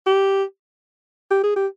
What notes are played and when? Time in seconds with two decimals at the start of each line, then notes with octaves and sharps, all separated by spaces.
0.07 G4
1.31 G4
1.44 G#4
1.56 G4